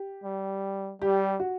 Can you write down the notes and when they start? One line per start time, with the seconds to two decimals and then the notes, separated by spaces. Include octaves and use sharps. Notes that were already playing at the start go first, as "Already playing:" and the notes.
Already playing: G4
0.24 G3
1.02 G3 G4
1.40 F#4